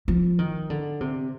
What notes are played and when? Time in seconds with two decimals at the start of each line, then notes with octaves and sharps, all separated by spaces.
0.08 F3
0.39 D#3
0.70 D3
1.01 C3